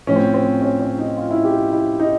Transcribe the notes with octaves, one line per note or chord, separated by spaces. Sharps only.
A2 F3 C#4
C4
C4
C#4
C#4
D#4
F4
E4
G4
E4
D#4